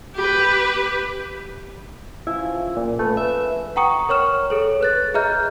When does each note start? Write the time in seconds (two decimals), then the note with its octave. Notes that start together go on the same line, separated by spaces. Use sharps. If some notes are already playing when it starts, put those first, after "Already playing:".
0.16 G4 B4
2.27 C#3 F3 C#4 E4
2.77 A#2
2.99 A3 G#4 B4
3.17 E5
3.76 F#5 G5 A#5 C#6 D#6 C#7
4.09 A#4 C#5 C#6 F6 E7
4.50 G#4 A4 C#5
4.81 B4 F#6 A6
5.14 G#4 D#5 E5 A#5 F6 G6